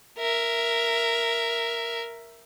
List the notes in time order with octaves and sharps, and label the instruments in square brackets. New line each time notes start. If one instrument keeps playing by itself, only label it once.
[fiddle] A#4 E5